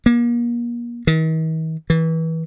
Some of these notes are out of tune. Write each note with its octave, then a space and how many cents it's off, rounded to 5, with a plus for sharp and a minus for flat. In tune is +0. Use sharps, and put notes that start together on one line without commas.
A#3 +35
D#3 +45
E3 -25